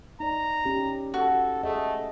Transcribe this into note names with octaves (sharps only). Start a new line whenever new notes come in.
D#4 D5 A#5
C#4 G4
F#4 A4
A3 G#4 D#5